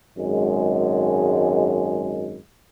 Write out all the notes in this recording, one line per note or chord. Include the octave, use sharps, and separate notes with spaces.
G#1 F#2 G#3